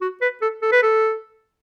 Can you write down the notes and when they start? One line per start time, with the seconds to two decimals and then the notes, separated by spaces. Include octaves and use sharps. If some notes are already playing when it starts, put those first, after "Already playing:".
0.01 F#4
0.21 B4
0.42 A4
0.62 A4
0.72 B4
0.82 A4